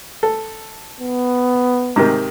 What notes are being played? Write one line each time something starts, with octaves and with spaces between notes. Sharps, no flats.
A4
B3
G#2 C3 D#3